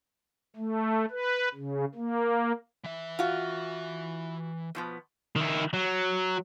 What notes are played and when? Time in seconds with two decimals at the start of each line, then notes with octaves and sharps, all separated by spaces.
0.56 A3
1.11 B4
1.54 C#3
1.95 A#3
2.84 E3 E5
3.19 F4 F#4
4.75 B2 F3 B3
5.36 D#3 E4
5.73 F#3